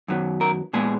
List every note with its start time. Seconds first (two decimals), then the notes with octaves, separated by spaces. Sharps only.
0.08 F#2 D#3 F#3 B3
0.41 A#4
0.73 A#2 G#3 B3 G#4